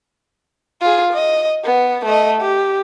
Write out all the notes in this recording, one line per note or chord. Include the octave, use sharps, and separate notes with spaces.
F4 G#4
D#5
B3
A3 D#5
G4